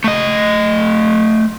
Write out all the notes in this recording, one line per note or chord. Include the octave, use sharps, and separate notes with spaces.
A3 D#5